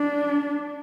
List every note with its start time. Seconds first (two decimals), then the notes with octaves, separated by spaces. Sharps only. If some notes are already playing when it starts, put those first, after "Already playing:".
Already playing: D4